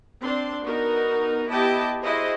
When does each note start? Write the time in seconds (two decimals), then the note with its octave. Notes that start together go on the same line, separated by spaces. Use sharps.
0.21 C4 D4 C6
0.64 B3 D#4 F#4 A#4
1.49 B3 E4 G4 D#5 G5 A5
2.02 E4 F#4 G#4 C5 D#5